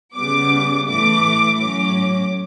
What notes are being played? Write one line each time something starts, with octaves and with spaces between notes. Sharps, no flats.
C#3 G3 B3 D6
A2 E3 A3 D6
A2 F#3 C#4 D6